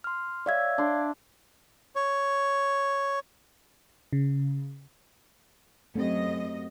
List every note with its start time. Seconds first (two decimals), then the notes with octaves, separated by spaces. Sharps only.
0.04 C6 F6
0.46 C#5 D5 E5 F5 G#6
0.78 D4 C6
1.95 C#5
4.13 C#3
5.95 F#2 A3 C4 G4 D#5